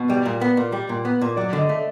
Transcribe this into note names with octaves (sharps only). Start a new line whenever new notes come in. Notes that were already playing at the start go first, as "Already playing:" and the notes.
Already playing: B2
G3 D5
A#2
B3
A#2
G3
A#2
B3
A#2
F#3 D5
D3 D#5
A3